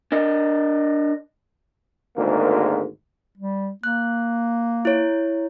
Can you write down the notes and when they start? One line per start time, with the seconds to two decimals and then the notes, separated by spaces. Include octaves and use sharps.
0.12 D4 A#4 D#5
2.16 G#1 D2 G#2 A#3 A#4
3.38 G3
3.84 A#3 F#6
4.85 E4 C#5